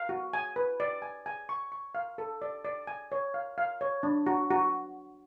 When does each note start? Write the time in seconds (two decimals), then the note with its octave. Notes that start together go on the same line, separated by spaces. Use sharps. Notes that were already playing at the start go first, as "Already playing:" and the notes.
Already playing: F5
0.09 F#4
0.34 G#5
0.56 B4
0.80 D5
1.02 G#5
1.26 G#5
1.49 C#6
1.72 C#6
1.95 F5
2.18 A4
2.42 D5
2.65 D5
2.87 G#5
3.12 C#5
3.34 F5
3.58 F5
3.81 C#5
4.03 D4
4.26 F#4
4.51 F#4